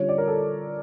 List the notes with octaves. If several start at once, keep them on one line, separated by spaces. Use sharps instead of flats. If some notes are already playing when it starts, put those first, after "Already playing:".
Already playing: D3 G3 C#4 F4 C#5
D5
A#4
A4